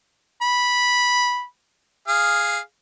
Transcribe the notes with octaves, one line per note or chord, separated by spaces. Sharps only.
B5
G#4 F5